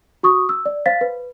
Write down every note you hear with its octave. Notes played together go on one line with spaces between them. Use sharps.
F#4 C#6 D#6
E6
D5
C5 F5 A6 B6
B4